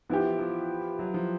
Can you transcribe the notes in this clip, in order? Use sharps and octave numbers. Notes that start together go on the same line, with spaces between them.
F3 B3 E4 G4
E3
F3
F#3
F3